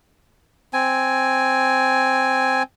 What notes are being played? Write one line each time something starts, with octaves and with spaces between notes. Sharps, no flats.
C4 G#5